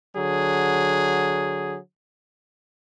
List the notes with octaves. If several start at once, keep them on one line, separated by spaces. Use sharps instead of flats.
D3 F#3 G#4